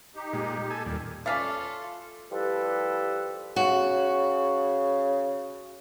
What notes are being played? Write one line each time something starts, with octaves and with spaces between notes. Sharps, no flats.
D#4 G4
A#2 G#3
A4 G#5
D#2 A#2 G3
A3 C#4 F4 A4 D5 F5 F6 B6
F3 G3 E4 G4 A4 B4
C#3 F#4